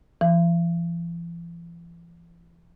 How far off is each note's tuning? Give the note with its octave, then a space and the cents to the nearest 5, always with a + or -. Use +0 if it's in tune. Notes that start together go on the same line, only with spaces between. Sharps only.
E3 +45